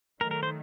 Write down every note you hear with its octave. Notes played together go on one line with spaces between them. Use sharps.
D#3 F#3 A3 A#4
A#4
C5